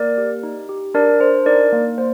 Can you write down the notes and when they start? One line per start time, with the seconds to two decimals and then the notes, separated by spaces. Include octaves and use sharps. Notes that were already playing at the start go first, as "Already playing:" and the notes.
Already playing: A#3 A#4 D5
0.18 G4
0.43 D#4
0.69 G4
0.94 D4 A#4 D5
1.20 D4 C5
1.46 D#4 A#4 D5
1.73 A#3
1.98 A#3 C5